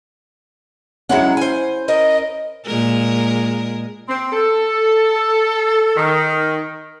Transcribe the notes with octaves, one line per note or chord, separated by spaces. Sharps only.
F#3 G#3 C#4 E4 F#5
C5 G#5
A#4 D#5
A#2 G#3 A#4
C4
A4
D#3